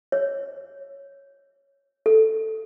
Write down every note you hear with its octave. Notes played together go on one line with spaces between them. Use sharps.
C#5
A4